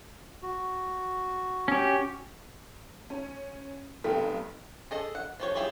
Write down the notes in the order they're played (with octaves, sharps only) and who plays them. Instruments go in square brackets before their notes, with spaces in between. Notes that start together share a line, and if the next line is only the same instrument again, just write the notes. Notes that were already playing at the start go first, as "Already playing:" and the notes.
[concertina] F#4
[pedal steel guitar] C#4 G4
[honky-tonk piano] C#4
[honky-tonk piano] F1 B1 [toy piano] A4 G5
[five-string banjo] G#4 A4 D#5
F#5
F3 G4 C#5
E4 F4 G4 G#4 C#5